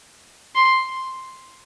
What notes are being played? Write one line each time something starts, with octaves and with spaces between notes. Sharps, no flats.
C6